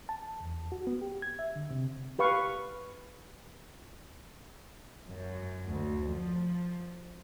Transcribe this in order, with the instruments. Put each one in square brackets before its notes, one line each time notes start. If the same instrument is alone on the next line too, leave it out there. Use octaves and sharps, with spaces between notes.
[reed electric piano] A5
E2
F#4
B3
G4
G#6
E5
D3
C3
[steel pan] G4 B4 F5 C#6
[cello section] F#2
D2
F3